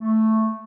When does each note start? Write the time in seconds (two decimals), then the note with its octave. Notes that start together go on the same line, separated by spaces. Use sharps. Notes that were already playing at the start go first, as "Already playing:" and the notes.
0.01 A3